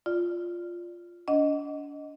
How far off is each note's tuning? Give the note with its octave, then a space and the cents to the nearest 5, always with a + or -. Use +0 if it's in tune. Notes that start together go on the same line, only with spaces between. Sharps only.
F4 +0 D5 +0
D4 -40 D#5 +0 F#5 +0